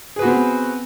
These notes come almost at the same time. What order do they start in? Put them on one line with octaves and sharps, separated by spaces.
G#4 B4 F#4 B3 C4